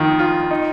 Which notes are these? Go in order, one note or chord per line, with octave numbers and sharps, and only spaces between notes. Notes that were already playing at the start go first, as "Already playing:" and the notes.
Already playing: F2 D#3 F4
F4
D#4